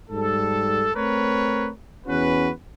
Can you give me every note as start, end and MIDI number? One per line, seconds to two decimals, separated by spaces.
0.10 0.90 44
0.10 0.90 55
0.10 0.90 69
0.95 1.69 57
0.95 1.69 60
0.95 1.69 70
0.95 1.69 71
0.95 1.69 73
2.07 2.50 40
2.07 2.50 61
2.07 2.50 66
2.07 2.50 71